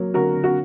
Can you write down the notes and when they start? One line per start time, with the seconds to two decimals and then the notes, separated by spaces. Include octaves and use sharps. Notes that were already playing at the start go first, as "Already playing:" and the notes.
Already playing: F#3 A#3 A#4 C#5
0.14 D3 F#4 A#4
0.35 D3
0.44 F#4